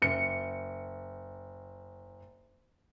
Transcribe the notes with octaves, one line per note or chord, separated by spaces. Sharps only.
F#1 C#7